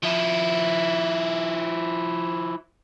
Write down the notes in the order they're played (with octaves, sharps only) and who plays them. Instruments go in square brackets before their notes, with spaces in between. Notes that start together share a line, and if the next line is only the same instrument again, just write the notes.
[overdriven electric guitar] F3 E4